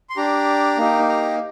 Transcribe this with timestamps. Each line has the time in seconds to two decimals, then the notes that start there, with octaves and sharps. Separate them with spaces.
0.10 C6
0.17 D4 G4 A#5
0.78 A#3 D#4 G4
1.09 A#5